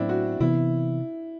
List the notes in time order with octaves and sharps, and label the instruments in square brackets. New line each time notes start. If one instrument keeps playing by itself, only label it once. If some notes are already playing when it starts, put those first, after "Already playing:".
Already playing: [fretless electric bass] A2 F#3 B3 [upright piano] C4 D4 E4
[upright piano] F#4
[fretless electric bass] C3 E3 B3 [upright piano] E4